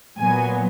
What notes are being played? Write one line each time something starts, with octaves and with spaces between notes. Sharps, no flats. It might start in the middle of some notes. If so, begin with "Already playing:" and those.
A#2 F#3 B3 G#5